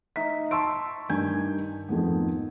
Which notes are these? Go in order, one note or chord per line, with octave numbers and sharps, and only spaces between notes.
D#4 E5 B6
A5 C6 C#6 E6 D7
G2 D#3 G#5 G6 G#6
F2 G#2 D#3 B3